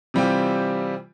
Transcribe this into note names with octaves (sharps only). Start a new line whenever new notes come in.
C3 E3 G3 C4 F4 G4